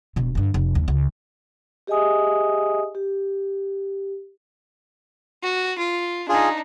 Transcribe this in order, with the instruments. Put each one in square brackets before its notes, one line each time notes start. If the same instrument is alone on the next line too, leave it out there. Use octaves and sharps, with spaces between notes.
[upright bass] E1 B2
G2 D3
F1
D#2
C#2
[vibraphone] G4 G#4 D#5 E5 G#5 D#6
G4
[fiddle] F#4
F4
[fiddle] D4 D#4 [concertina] F4 G#4